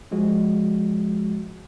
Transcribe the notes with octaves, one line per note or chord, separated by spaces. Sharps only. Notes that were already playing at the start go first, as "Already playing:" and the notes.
F3 G#3 F4 F#4